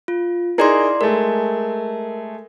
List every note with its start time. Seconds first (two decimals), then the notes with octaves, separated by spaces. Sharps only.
0.08 F4
0.58 D#4 E4 G#4 A#4 D5 C6
1.01 G#3 A3 A#4